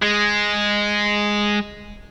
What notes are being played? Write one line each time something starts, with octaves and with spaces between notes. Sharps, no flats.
G#3